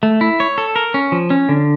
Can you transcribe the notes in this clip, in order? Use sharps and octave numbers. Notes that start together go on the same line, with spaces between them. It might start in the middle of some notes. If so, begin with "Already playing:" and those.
A3
E4
C#5
A4
A#4
C#4
F3
C#4
D3